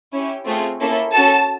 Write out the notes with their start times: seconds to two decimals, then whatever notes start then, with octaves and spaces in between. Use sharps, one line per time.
0.12 C#4 E4 G4
0.46 A3 C4 F4 G#4
0.80 A#3 C#4 E4 A4
1.13 C#4 F#4 A4 A5